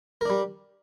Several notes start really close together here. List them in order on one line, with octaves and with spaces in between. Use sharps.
A#4 D4 G3